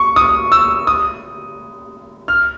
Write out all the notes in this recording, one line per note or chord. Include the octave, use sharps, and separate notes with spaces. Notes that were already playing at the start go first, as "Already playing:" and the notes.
Already playing: C#6
D#6
E6
D#6
F6